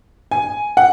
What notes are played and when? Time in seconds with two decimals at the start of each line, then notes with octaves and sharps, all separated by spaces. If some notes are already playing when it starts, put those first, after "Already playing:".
0.31 G#5
0.77 F#5